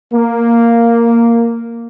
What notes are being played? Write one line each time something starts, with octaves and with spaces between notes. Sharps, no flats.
A#3